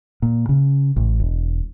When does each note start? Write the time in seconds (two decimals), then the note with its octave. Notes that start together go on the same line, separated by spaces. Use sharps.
0.22 A#2
0.49 C#3
0.96 A1
1.20 E1